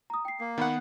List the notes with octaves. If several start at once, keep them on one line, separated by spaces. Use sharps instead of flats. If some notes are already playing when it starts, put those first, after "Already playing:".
A#5 D#6
G5 C7
A#3 C7
D#3 B3 F#5 B5 F#6